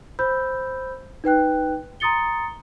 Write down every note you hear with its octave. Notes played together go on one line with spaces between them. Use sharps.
C5 B5 E6 G6
D#4 B4 G5 F#6
A#5 C6 D#6 A6 C#7 G7